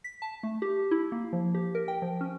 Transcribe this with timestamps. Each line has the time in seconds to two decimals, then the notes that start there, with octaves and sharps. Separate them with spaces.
0.04 B6
0.22 A5
0.43 A3
0.62 G4
0.91 E4
1.12 A#3
1.33 F3
1.54 G4
1.75 A#4
1.88 G5
2.02 F3
2.21 C#4